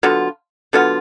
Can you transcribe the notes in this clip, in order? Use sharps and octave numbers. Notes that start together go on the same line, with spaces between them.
D3 F#3 B3 F4
D3 F#3 B3 F4